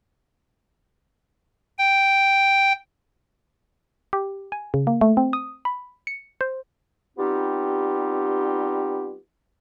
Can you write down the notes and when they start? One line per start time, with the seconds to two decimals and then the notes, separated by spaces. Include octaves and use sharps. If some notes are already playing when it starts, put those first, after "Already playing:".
1.78 G5
4.13 G4
4.52 G#5
4.74 C#3
4.87 A#3
5.01 A3
5.17 C4
5.33 D#6
5.65 B5
6.07 C#7
6.41 C5
7.18 G3 B3 C4 D#4 F4 G4